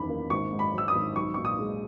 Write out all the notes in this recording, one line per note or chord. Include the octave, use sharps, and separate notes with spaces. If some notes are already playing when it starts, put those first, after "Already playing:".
Already playing: F#1 E2 D#3 B5
A#3
G#1 C#6
G#2
B5
F#3
E6
D#6
G#1
B1 C#6
A#2 C#6
D#6
G#3